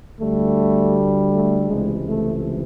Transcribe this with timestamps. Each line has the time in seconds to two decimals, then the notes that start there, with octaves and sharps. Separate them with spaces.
0.20 D2 D3 G3 A3
1.32 A3
1.69 C#2 C3 E3 G#3
2.07 A3